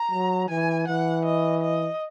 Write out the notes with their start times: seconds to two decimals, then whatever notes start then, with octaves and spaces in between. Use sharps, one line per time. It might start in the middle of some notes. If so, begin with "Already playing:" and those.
Already playing: A#5
0.12 F#3
0.49 E3 G#5
0.87 E3 F#5
1.25 D#5
1.62 D#5